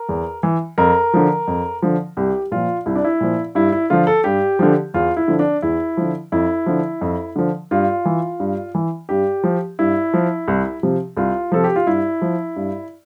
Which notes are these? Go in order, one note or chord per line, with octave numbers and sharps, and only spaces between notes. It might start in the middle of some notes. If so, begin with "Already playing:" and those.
Already playing: A#4
E2
E3
F2 A#4
D3 F3
F2
D3 F3
C2 G4
A#2 F3 F4
C2 E4
D4
E4
A#2 F3
G2 E4
E4
D3 F3 F4
A4
G2 G4
D3 F3
E2 F4
E4
D3 F3
D4
E2 E4
D3 F3
F2 E4
D3 F3
F2
D3 F3
G2 F4
E3
G2
E3
G2 G4
F3
G2 E4
F3
C2
C3 F3
C2 F4
C3 F3 A4
G4
F4
G2 E4
F3
G2